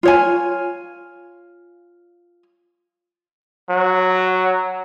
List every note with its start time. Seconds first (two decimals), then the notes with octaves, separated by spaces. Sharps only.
0.03 F4 C#5 G#5
3.70 F#3